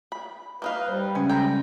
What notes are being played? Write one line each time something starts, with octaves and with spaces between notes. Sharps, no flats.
B5
A#3 D#4 B4 F5
G3 C5
C#3 G#3 C#4 G#5
A4 G5 G#5 A#5